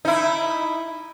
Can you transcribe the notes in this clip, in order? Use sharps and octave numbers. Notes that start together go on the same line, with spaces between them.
D#4 E4